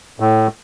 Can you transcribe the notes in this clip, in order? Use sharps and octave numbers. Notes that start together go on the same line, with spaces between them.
A2